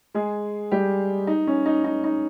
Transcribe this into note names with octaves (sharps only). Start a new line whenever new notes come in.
G#3 G#4
G3 G4
D#4
C#4
D#4
D#4
D#4